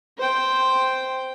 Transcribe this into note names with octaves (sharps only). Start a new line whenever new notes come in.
C5 G5